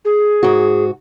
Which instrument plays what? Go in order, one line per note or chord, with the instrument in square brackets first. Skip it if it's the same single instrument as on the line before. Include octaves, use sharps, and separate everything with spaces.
[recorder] G#4
[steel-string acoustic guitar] G#2 F#4